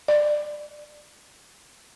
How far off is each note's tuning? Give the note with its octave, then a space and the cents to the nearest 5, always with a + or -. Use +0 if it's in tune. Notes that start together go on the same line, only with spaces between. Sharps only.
D5 +20